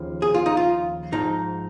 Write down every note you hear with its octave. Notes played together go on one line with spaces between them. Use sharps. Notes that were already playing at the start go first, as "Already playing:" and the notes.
Already playing: D#2 C#3 F3
G#4
F4
D#4
F4
G#2 F3 D#4